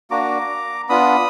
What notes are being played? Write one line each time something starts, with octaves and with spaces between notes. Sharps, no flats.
A#3 D4 F#4 A#5 D6
B3 D4 F4 B5 D#6